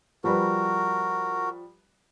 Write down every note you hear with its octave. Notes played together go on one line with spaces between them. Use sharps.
F3 G3 F#4 A#4 B4